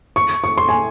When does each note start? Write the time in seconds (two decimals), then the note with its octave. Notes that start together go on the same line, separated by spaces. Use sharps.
0.16 C#6
0.44 C#6
0.58 C6
0.69 G#5